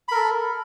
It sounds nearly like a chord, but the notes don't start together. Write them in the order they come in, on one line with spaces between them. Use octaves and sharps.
B5 A#4 A4